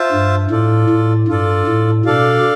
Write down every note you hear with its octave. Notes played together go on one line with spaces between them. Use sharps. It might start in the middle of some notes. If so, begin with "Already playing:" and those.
Already playing: F4 C5 E5 A5
G2
A2 F4 A4 D5
A2
G2 F4 A4 D5
A2
B2 D4 A4 D5 F5